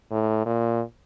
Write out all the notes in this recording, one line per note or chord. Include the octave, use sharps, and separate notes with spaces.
A2
A#2